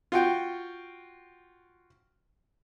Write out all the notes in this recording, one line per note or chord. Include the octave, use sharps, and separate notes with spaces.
F4 F#4 G5